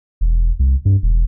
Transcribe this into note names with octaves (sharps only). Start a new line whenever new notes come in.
E1
C2
G2
E1